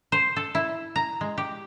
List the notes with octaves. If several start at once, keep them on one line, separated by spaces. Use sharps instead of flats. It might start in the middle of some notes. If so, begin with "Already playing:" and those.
C5
A4
E4
A#5
G#3
G4